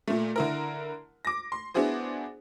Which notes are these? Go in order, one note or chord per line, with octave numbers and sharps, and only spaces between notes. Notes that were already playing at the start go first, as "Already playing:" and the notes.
A#2 A3
D3 E4 A#4
D6 A#6
C6
B3 D4 E4 F#4 G#4 C5